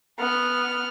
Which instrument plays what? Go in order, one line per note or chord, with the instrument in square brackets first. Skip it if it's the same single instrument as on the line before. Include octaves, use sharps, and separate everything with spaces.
[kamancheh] B3 F6